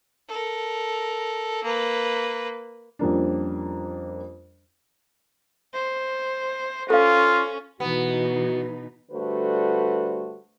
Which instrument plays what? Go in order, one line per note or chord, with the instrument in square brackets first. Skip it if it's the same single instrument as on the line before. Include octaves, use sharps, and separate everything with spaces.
[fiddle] A4 A#4
A#3 B4
[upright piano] F2 F3 G3 A#3 C#4 D4
[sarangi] C5
[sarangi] C#4 [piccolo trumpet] F4 [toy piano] A4 F5
[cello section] B2 E3 D#4 [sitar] B3 [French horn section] F#4
[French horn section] D3 G3 A3 F#4 B4 C5